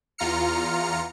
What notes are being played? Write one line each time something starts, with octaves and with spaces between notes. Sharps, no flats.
E2 F4 A#5 F6 C#7